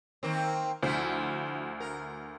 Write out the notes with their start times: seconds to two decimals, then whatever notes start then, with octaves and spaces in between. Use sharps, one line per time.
0.23 D#3 A#3 C4
0.83 D2 F3 E4 C5
1.80 A#4